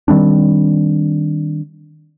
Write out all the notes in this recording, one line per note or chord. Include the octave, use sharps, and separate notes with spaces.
D#3 G3 C4 D4